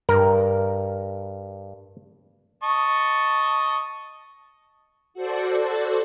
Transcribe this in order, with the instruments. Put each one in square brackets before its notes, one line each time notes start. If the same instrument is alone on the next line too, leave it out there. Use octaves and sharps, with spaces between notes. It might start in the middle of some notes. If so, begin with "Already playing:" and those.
[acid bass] G2 [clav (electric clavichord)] A#4
[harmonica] D#5 A5 C#6
[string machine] F#4 A4 C5 D5